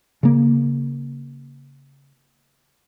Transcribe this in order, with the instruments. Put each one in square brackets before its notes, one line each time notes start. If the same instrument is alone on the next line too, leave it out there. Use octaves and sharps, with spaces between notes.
[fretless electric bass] C#3 A#3